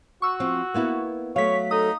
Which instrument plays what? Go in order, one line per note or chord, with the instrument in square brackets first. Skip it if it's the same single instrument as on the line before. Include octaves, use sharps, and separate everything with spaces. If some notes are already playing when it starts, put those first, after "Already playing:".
[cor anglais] F#4 [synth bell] C#6 E6
[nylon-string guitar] F3 C4
A#3 B3 E4
[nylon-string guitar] F#3 A3 [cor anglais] C#5 [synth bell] F5 B6
[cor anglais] D#4 [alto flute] A4 [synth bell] D#6